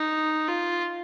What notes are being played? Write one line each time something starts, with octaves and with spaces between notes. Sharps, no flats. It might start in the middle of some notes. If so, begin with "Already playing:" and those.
Already playing: D#4
F4